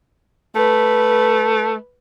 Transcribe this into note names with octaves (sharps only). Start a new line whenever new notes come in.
A3 B4